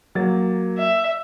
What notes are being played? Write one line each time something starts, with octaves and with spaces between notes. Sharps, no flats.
F#3 A#3 A6
E5